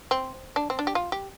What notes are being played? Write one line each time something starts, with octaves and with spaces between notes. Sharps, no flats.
C4
D4
C4
D4
G4
F4
G4